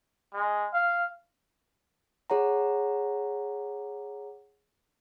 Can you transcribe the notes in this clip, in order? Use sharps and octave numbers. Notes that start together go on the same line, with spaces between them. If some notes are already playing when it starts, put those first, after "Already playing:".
G#3
F5
G#4 C#5 F#5 A#5